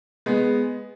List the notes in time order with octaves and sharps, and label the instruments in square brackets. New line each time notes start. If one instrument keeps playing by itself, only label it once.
[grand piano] G#3 B3